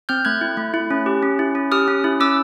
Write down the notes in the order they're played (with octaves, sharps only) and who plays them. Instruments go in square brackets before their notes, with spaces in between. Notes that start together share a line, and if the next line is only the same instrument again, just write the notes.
[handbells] C4 F6 G6
A3 F#6 G#6
E4
A3
E4
C#4
G4
C#4
E4
C#4
G4 D#6 F6
C#4
E4
C#4 D6 E6